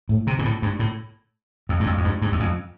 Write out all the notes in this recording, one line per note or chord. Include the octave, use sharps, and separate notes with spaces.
A2
C3
A#2
A2
G2
A2
F2
G2
F2
F2
G2
G2
E2
F2